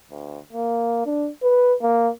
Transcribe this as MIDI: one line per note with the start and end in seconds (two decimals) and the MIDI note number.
0.11 0.39 38
0.53 1.01 58
1.06 1.28 62
1.43 1.74 71
1.82 2.09 58